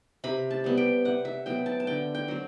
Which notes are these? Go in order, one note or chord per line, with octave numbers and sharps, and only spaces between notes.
C3 B5
A5
G3 B3
G5
C3 F#5
E5
F#3 B3 G5
A5
A5
D3 G5
G5
F#3 C4